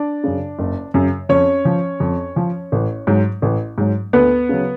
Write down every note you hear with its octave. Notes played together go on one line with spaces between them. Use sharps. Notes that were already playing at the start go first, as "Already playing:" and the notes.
Already playing: D4 D5
F#2 C#3
F#1
F#2 C#3
F2 C#4 C#5
F3
F2
F3
A1
G#2 F#3
A1
G#2 F#3
D2 B3 B4
C#3 F#3